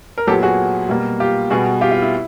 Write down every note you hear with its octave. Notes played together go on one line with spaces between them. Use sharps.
A#4
A#2 F#3 B3 G4 A4
F#4 G#4
B2 G3 A#3
F4 G4
B2 G3 B3 F#4 G#4
F4 G4
F4
E4